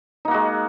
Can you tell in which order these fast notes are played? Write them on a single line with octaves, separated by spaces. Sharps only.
D#4 A#3 F#4 G#3